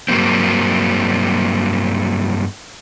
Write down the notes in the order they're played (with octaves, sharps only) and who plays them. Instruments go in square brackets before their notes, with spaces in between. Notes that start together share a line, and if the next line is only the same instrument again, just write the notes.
[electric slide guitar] G2 F#3 A#3 C4